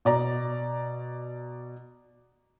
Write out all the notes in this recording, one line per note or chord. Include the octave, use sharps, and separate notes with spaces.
B2 D5 A#5